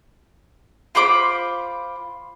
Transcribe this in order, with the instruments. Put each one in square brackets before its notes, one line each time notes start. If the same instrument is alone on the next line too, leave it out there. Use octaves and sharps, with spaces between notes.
[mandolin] F4 C5 B5 D6